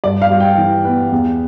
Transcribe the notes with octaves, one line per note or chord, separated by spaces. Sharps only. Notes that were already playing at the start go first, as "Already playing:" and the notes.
G2 D5
F5
G3
G5
E3
B3
E2